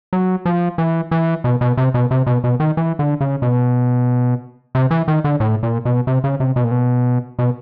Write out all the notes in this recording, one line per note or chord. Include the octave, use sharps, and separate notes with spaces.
F#3
F3
E3
E3
B2
B2
C3
B2
C3
B2
B2
D#3
E3
D3
C#3
B2
C3
E3
D#3
D3
A2
A#2
B2
C3
C#3
C3
B2
A#2
B2
B2